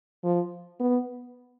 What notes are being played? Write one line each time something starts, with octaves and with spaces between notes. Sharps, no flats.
F3
B3